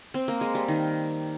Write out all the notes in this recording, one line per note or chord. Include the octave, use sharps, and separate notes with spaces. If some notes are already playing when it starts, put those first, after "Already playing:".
C4
A#3
G#3
G3
D#3